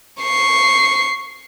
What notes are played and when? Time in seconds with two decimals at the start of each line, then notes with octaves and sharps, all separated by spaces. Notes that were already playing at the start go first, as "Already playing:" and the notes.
0.22 C#6 C7